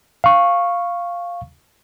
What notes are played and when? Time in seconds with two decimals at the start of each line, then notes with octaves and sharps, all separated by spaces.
0.24 F5 C#6